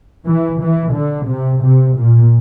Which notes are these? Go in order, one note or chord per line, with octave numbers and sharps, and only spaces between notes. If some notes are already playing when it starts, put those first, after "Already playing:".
E3
E3
D3
C3
C3
A#2